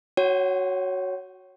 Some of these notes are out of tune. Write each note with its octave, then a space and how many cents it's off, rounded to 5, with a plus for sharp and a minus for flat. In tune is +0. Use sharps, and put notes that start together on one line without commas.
F#4 +0 C#5 +0 F#5 +45